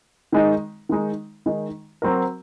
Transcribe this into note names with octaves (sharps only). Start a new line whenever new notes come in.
D#3 G#3 D#4
D#3 G#3 D#4
D#3 G#3 D#4
F#3 C4 F#4 A#4